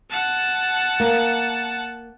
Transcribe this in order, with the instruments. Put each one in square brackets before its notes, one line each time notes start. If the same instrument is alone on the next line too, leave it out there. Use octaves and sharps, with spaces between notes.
[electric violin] F#5 A5
[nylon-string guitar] A#3